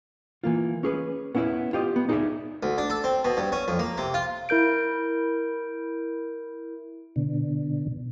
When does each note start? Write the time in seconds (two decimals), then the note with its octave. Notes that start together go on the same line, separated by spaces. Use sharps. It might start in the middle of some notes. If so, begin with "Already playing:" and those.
0.44 E3 A#3 F4
0.83 C#4 G#4 B4
1.35 B3 C#4 E4 D#5 E5
1.73 F4 G4 D#5
1.96 B3
2.09 D#4 G#4 A4 C#5 D5 E5
2.63 D2
2.78 D4
2.90 A4
3.04 C4
3.25 B2
3.37 G2
3.52 C#4
3.68 F2
3.79 A#3
3.98 C3
4.14 F4
4.49 E4 A#4 G6 D7
7.16 B2 D3